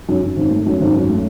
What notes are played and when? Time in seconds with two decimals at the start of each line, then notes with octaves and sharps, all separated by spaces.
0.09 F#2
0.23 F#2
0.37 G#1
0.51 A3
0.66 F#2
0.81 G#1
0.94 F#2
1.09 A3